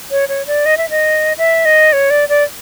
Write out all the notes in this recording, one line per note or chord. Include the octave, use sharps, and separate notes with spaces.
C#5
C#5
D5
D#5
E5
D#5
E5
D#5
C#5
D5
D5